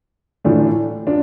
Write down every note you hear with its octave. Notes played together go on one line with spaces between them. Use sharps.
A2 E3 A3 D4 F4
D4 F4